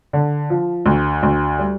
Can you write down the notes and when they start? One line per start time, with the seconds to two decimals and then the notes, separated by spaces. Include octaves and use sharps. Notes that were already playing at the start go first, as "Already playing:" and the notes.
0.13 D3
0.50 F3
0.86 D2
1.23 D2
1.59 G3